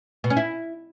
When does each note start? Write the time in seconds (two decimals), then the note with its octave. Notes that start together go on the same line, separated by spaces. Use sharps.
0.24 B2
0.30 C#4
0.37 E4